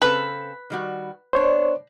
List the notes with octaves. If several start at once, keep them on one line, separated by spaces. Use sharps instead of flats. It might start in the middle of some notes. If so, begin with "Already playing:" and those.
C#3 C4 A4 B4
D#3 G3 F#4
B3 D4 C5 C#5